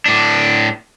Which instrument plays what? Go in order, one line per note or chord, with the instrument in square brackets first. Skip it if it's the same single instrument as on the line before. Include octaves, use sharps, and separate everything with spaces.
[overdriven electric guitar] A2 D4